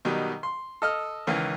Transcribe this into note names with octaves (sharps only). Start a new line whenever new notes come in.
B2 D#3 F#3 G3
C6
A4 D#5 F6
C#2 D#3 E3 C#4